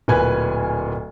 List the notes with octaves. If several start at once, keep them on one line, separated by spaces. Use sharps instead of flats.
D1 A#2 B4 G#5 G#6